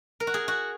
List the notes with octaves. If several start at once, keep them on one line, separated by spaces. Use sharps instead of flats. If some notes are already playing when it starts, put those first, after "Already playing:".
A#4
F#4
G#4
F#4